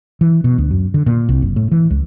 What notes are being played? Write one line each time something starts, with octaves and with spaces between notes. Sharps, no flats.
E3
B2
D2
F#2
D3
A#2
C2
F#1
A2
E3
C#2